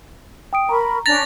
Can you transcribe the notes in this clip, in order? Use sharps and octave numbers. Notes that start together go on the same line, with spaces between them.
G5 D#6 D7
A#4 A#5 B5 C#6
C#4 D4 A6 A#6 F7